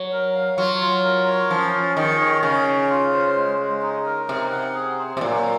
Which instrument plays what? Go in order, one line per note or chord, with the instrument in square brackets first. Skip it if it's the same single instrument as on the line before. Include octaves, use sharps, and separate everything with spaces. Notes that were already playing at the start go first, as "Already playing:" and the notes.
Already playing: [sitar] F#3
[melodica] A#4
F5
[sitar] F#3 [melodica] F4
[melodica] F4
A#4
C#5
[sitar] F3 [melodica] C#4
[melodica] C#4
[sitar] D#3 [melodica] G#4
[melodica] C#5
[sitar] C#3 [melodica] C#4
[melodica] C#4
F4
C5
G#3
G#3
D#4
A#4
[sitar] C3 [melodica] D#4
[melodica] F#5
G#4
C5
[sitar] C3
[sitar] A#2 [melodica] F#3